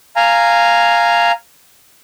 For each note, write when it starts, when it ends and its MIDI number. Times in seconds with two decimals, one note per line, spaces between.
0.16 1.32 77
0.16 1.32 80
0.16 1.32 82